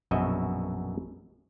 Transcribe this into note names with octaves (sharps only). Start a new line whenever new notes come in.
A#1 F#2 B2 F#4 D#5 E5